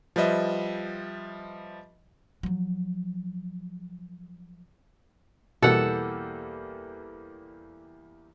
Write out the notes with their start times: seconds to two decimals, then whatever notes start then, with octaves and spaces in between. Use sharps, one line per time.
0.16 F3 G3 B4 D#5 E5
2.43 F3 F#3
5.62 E2 B2 G3 A#3 A4 F#5